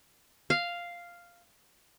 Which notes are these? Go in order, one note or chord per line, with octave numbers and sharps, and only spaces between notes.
F5